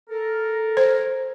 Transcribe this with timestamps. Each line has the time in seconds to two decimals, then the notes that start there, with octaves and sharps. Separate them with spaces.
0.10 A4 A#4
0.77 C5